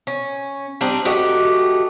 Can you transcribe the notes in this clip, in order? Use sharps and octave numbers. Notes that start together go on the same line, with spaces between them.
C#4
G3 C4 D4 D#4
A3 F#4 G4 D#5